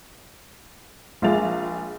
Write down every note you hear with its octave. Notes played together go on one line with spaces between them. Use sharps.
A#1 G#3 F4 G#4 A6 F7